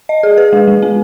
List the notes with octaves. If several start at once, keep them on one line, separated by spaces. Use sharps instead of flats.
D#5
G#4
B4
G#3
G#3
B3